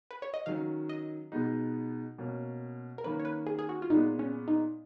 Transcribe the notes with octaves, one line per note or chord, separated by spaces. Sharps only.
B4
C#5
D#5
D#3 F#3 C#4 F5
D#5
B2 G#3 B3 D#4
B2 A#3 C#4
A#4
D#3 A#3 C#4 B4
C#5
B4
G#4
G#4
F#4
F4
A#2 G#3 B3 D#4
C#4
D#4